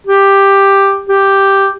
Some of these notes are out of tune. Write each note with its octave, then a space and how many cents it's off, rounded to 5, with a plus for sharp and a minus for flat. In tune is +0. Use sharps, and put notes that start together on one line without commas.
G4 +5
G4 +0